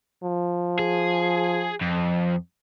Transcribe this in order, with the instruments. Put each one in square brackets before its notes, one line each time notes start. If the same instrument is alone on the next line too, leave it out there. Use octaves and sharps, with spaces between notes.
[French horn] F3
[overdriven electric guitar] G#4
F2